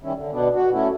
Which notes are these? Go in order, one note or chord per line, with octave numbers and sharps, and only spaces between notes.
D#3 G3 C#4 E4
D3
B2 B3 D4
F#4
A3 C#4 E4